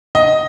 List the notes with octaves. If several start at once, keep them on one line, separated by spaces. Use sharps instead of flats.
D#5